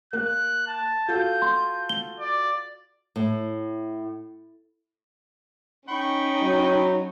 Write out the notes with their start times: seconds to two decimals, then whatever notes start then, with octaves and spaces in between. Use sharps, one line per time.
0.13 A#3 F#6
0.67 A5
1.08 F4 F#4 A4 G6
1.42 C6
1.89 G7
2.19 D5
3.16 A2
5.89 C#4 D#4 G5 B5 C#6
6.42 F#3